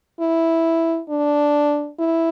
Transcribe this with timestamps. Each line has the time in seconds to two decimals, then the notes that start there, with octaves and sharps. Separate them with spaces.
0.20 E4
1.10 D4
1.99 E4